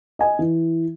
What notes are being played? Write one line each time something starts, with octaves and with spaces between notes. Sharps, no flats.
D#5 G#5
E3